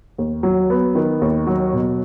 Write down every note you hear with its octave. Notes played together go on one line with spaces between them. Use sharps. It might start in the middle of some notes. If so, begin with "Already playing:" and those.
D#2
F#3
B3
D#3
D#2
F#3
B2